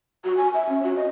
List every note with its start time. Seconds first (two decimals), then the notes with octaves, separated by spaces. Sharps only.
0.25 F#4
0.37 G#5
0.54 E5
0.69 C#4
0.83 F#4
0.96 D#5